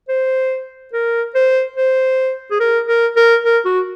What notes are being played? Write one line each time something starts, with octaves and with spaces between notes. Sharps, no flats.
C5
A#4
C5
C5
G#4
A#4
A#4
A#4
A#4
F#4